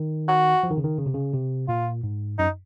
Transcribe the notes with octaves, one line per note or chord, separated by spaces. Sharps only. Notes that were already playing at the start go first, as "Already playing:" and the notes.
Already playing: D#3
F#4
F3
D#3
C#3
D#3
C#3
C3
C#3
C3
A#2 F4
G#2
F#2 D#4